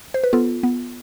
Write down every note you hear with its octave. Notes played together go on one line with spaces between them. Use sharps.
C5
B4
B3 F4 A4
B3